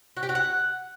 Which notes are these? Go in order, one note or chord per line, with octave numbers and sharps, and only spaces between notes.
F#4
G4
F#4
F#5